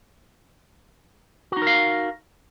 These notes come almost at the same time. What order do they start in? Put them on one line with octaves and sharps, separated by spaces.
F#4 D#4 A#4 F5